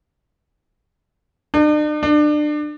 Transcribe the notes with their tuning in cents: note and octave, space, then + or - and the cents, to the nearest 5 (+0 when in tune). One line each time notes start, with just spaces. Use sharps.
D4 +45
D4 +30